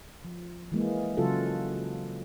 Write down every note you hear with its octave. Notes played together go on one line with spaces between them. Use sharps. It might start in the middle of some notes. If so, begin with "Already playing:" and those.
F3
E3 G#3 A#3
C#3 F#3 F4 F#4 A4